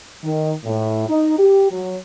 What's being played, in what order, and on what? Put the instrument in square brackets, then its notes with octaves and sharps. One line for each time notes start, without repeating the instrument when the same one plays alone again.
[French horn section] D#3
A2
D#4
G4
F#3